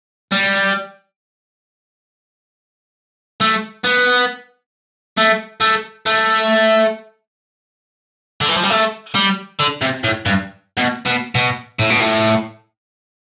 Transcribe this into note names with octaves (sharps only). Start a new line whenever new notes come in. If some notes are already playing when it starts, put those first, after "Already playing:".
G3
A3
B3
A3
A3
A3
D3
E3
F3
G3
A3
G3
D3
C3
A2
G2
B2
B2
B2
A2
B2
A2